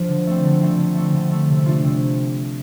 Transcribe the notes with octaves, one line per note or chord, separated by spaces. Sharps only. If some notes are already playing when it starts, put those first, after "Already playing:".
Already playing: F3 D4
D3
A3 C4
D3
A3 C4
D3
A3 C4
D3
A3 C4
C3
A3 D4 F4
C3